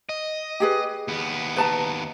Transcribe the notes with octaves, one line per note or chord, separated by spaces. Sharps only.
D#5
G4 G#4 B4
D#2 B3
B4 A5 A#5